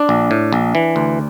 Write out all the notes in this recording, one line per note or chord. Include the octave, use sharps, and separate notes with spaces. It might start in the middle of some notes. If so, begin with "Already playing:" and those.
Already playing: D4
A#1
A2
A#1
E3
D2